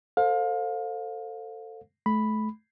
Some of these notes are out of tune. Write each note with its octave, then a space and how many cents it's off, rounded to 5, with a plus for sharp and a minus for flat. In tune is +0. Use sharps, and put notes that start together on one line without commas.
A4 +20 C5 +0 F5 +30
A3 -30 B5 +0